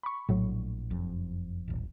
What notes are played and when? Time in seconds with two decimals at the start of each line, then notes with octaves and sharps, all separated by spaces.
0.03 B5 C#6
0.29 A#1 A2 F#3
0.90 F#1 F2
1.68 D#1 A1